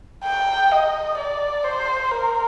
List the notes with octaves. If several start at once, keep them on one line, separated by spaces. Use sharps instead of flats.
G5
D#5
D5
C5
A#4